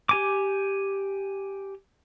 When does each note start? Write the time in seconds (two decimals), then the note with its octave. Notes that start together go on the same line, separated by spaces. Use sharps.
0.09 G4 G#5 D6